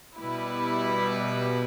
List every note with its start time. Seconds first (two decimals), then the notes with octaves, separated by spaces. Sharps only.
0.18 B2 G3 E4 B4